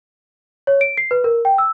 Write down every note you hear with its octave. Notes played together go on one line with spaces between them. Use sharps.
C#5
D7
C7
B4
A#4
G5
E6